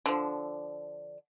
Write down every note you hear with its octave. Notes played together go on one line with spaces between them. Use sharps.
D3 F3